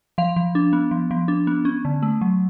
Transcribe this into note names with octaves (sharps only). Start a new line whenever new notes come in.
F3 F5
F3
D4
B3
F3
F3
D4
B3
C#4
D3
A3
F#3